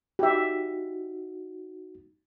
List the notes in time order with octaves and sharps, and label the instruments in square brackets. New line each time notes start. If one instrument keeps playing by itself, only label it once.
[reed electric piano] D#4 F#4 [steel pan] G4 E5